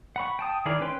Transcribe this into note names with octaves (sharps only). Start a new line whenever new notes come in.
F#5 B5 C#6
G5 A5 D#6
D#3 E4 G#4 A#4 D5
C#4 B4 G5 C6